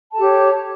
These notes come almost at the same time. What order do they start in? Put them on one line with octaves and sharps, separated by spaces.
A5 A4 G4 C#5